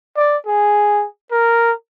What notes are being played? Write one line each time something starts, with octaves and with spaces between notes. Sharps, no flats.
D5
G#4
A#4